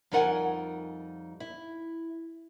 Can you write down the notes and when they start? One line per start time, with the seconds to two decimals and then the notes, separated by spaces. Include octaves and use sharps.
0.11 F2 G3 D#4 A#4 F#5 G#5
1.40 E4